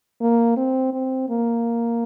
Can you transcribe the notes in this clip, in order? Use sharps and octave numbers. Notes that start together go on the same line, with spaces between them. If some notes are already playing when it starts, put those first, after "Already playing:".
A#3
C4
C4
A#3